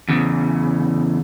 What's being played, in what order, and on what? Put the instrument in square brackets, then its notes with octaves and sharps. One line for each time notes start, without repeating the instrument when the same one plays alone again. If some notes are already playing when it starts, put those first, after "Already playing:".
[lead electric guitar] E2 C#3